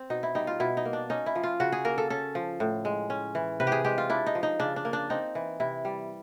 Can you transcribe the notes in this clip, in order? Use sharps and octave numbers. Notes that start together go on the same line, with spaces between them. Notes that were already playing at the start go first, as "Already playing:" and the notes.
Already playing: C4
B2 D#4
E4
G3 D#4
F4
B2 E4
D#4
A#3
D4
C#4 D#4
E4
F3
F4
C#3 F#4
G#4
A#3 A#4
A4
C#4 A4
F3
A2
G#3
C#4
E3
C3 B4
G4
G#4
G#3 G4
F4
D4 E4
D#4
F3
D#4
C#3 D4
D4
A#3
D4
C4 D#4
E3
C3 E4
G3